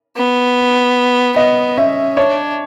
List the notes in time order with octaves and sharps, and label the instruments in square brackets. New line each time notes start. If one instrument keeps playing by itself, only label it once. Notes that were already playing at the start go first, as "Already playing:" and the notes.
[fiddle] B3
[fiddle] B3 [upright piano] D#5
[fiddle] C#4 [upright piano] E5
[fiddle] D4 [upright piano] C#5